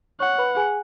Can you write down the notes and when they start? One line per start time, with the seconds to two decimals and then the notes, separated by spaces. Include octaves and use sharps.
0.20 C#5 F#5 C#6
0.38 B4 B5
0.56 G#4 G#5